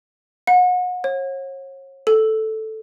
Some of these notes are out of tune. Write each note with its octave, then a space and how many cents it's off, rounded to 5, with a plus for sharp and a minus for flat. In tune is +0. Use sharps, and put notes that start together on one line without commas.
F#5 -35
C#5 -40
A4 -5